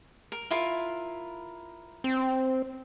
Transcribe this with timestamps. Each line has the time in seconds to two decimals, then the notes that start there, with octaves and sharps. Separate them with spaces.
0.32 A#4
0.50 E4 F4 A#4
2.04 C4